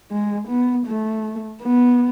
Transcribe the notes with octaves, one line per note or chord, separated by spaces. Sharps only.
G#3
B3
A3
B3